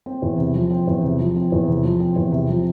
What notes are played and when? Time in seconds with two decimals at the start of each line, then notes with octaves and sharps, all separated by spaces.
0.06 C4
0.22 E2
0.39 C3
0.55 F3
0.71 C4
0.87 E2
1.04 C3
1.19 F3
1.36 C4
1.52 E2
1.68 C3
1.84 F3
2.00 C4
2.16 E2
2.32 C3
2.49 F3